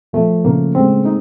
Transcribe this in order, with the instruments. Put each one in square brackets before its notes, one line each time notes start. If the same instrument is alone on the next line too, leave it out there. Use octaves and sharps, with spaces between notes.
[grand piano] F3 [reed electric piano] A3
[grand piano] C#3 [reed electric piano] A#3
[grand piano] G#3 [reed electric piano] C4
[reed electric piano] D#4